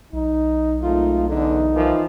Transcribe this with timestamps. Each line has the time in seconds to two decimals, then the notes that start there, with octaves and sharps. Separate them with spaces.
0.13 B1 D#4
0.83 G#1 A3 D#4 F4
1.29 E2 D3 D#4
1.74 E3 F3 A#3